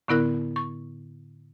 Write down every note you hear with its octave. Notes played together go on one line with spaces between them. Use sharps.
A2 D3 B3 E4 A#4 F#6
C#6